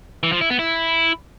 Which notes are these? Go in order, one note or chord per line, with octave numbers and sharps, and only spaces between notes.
E3
F3
E4
B3
E4